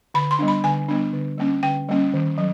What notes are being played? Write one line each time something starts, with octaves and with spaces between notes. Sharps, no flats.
D3 B5
C6
G3 B3 D4
B5
D3 G#5
G3 B3 D4
D3
G3 A#3 C#4
D3 G5
G3 A#3 C#4
D#3
F#3